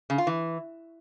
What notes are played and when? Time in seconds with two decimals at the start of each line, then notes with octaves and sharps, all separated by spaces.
0.10 C#3
0.18 F4
0.27 E3